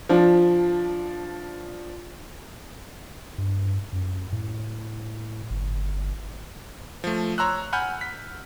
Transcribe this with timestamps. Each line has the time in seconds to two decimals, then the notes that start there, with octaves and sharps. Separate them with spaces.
0.09 F3 D4
3.38 G2
3.92 F#2
4.32 A2
5.51 G1
7.04 F3 A3
7.38 C#5 A#5 C6 E6 F#6
7.73 F#5 G#5 B5 F6 G6
8.01 B6